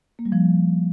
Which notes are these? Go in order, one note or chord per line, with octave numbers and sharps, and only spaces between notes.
A#3
G3
F3